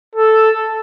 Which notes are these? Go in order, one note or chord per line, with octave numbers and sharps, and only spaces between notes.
A4